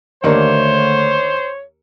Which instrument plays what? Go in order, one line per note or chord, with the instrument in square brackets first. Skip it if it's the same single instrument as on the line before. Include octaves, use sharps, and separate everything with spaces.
[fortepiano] D#2 A#3 D4 [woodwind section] D3 A3 [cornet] C5 [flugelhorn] C#5